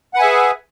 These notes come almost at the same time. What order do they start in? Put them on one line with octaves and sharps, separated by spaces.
F#5 B4 G#5 E5 G#4